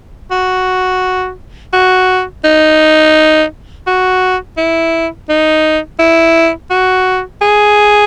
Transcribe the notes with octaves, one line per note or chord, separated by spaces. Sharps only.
F#4
F#4
D#4
F#4
E4
D#4
E4
F#4
G#4